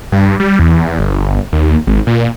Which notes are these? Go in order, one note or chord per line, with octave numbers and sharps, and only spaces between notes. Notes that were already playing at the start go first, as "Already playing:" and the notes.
G2
G3
E2
G1
D#2
G#1
A#2